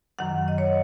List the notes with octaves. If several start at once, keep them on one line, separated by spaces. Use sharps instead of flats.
F#2 D#3 F#3 F#5
D#5
C#5